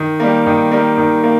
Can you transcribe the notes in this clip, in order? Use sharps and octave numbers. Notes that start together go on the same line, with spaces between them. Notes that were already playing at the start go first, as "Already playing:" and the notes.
Already playing: D#3
G3 A#3
D#3
G3 A#3
D#3
A#3